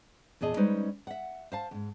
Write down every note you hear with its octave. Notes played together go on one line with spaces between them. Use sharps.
E2 A#2 G#4 D#5 A5
G3 G#3 C#4 D#4 B4 C5
E5 F#5
C5 F5 A5
E2 G#2